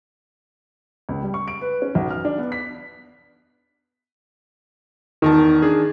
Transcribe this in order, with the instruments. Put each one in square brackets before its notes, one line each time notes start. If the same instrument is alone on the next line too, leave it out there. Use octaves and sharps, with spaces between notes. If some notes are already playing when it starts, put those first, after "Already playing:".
[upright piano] C#2
G3
C#6
D7
B4
C#4
B1
F6
D4
B3
B6
[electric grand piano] E2 A#4 A5 [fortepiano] D#3
[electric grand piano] D4 G#4